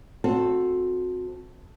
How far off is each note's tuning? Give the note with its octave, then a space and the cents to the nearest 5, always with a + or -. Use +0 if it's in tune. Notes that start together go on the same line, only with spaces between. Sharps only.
C4 +5 F#4 -25 A4 +0